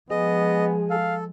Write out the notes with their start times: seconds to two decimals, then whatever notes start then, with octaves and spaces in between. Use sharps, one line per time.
0.10 F3 G#3 B3 G#4 D#5
0.90 A4 F5